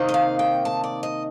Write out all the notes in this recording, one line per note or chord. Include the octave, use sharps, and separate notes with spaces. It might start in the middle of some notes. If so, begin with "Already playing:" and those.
Already playing: C3 D#3 A#3 D#4
D#5
F5
G5
A5
D5
D#5